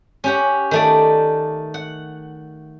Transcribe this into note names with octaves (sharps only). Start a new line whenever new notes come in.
C#4 G4 F#5
D#3 A3 D5
F#5